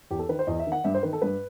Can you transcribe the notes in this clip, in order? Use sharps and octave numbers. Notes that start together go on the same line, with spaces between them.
E2 G4
A4
D#3 B4
C5
E2 D#5
E5
D#3
F#5
G2 E5
C5
D#3 B4
A4
G2 B4